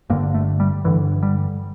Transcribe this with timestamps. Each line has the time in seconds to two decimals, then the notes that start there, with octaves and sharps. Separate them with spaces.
0.10 G1 G2 D3 A#3
0.34 A3
0.60 G3
0.84 G1 G2 D3 E3
1.23 G3